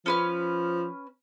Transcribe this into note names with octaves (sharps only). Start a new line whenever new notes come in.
F3 C#4 B4 F6